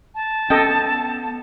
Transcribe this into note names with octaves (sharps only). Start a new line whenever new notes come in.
A5
B3 C#4 A4 D#5 G5